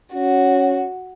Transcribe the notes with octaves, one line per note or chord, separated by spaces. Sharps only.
C#4 F#4